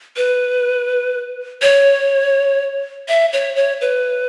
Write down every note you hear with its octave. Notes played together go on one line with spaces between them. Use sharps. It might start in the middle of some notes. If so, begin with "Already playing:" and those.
B4
C#5
E5
C#5
C#5
B4